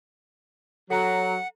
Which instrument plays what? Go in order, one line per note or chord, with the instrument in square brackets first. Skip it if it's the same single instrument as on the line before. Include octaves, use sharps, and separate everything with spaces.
[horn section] F#3 [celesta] A4 A#5 [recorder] F#5